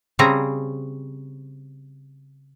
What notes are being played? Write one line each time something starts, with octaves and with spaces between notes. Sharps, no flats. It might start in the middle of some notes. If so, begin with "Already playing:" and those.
C#3 G3 C4 G#4 A#5